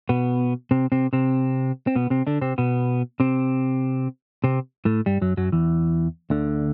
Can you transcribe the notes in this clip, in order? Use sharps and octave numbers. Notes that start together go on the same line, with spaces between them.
B2 B3
C3 C4
C3 C4
C3 C4
C4
B2 B3
C3 C4
D3 D4
C3 C4
B2 B3
C3 C4
C3 C4
A2 A3
G2 G3
F#2 F#3
F#2 F#3
E2 E3
D2 D3